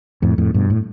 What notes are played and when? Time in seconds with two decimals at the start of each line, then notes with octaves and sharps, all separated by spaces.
0.22 F2 A2
0.38 F2 A2
0.54 G2 B2
0.70 A2